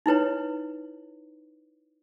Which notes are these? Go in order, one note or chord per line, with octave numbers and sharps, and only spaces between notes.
D#4 E4 B4 C#5